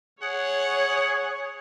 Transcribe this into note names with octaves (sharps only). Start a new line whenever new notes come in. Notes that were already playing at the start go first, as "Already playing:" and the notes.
G#4 C#5 F#5